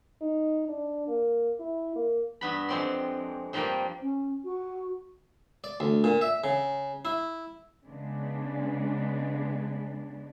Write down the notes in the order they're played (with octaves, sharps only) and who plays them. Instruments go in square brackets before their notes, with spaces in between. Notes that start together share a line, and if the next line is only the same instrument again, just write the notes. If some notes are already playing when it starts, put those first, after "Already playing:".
[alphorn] D#4
D4
A#3
E4
A#3
[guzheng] G2 B3 B5
F2 G#3 C4 D5 C6
G2 F3 G3 A#3 D4 G5
[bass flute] C#4
F#4
[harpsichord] D5
D2
A#2
E5
C#3
E4
[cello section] C#3 G#3 B3 D4